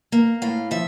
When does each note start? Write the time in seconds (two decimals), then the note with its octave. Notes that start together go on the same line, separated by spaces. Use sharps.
0.12 A#3
0.42 A2 F5
0.71 F3 E5